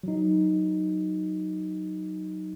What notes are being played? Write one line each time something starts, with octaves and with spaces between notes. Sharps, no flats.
F#3 D#4